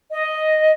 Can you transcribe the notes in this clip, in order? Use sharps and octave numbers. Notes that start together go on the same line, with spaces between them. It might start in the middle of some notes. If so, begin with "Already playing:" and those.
D#5